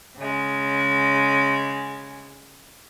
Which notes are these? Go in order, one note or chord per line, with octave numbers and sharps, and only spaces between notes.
C#3 G#3